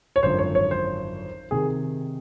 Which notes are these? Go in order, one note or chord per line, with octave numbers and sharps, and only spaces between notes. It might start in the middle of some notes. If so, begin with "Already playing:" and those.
C#5
G#1 F#2 D3 F3 C5
C#5
C#5
C5
C3 D#3 G#4